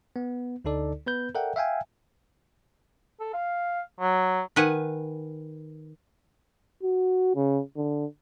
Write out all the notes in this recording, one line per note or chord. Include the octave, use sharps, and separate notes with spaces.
B3
D2 D3 D#4 A4 D5
B3 B4 G6
A4 A#4 D5 E5 F#5 G5
E5 F5 G5 G#5
A4
F5
F#3
D#3 B4 F#5 G#5
F#4
C#3
D3